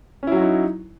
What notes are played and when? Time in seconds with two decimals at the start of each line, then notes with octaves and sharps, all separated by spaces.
0.23 C#4
0.27 E4
0.32 F#3
0.37 F#4
0.41 D#4